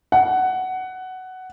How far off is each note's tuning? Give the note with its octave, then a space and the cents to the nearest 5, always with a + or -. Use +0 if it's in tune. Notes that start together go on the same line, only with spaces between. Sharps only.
F#5 +10